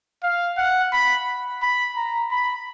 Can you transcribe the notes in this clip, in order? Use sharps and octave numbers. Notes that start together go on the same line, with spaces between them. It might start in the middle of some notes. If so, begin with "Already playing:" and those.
F5
F#5
B5
B5
A#5
B5